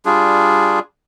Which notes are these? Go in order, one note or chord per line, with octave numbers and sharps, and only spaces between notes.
G3 D4 F4 G#4